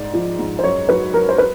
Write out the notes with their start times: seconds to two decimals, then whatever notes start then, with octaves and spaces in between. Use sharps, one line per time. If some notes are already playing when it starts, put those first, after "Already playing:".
Already playing: G#2 D5
0.14 F3
0.39 G#2
0.59 C5
0.63 F#2 C#5
0.89 F#3 B4
1.14 F#3 A#4
1.29 C5
1.38 B4